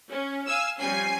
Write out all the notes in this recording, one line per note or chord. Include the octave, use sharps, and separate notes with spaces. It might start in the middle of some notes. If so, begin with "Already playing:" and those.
C#4
F5 G#5 E6
F3 G3 C4 C#4 G#5 C7